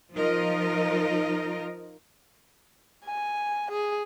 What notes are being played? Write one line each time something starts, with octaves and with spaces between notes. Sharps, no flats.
F3 D#4 F4 A#4 D#5
G#5
G#4